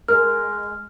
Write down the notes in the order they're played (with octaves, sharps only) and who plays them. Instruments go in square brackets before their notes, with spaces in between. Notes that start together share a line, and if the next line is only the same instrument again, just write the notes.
[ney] G#3 [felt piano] A#4 [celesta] F6